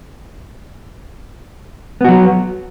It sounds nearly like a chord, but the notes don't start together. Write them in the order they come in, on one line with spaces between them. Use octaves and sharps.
B3 F#4 F#3